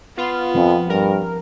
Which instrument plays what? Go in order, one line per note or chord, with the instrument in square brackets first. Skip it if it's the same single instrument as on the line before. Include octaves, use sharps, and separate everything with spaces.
[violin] B3 [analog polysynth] F4
[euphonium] F2 [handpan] F3 C4
[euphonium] G2 [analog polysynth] A#4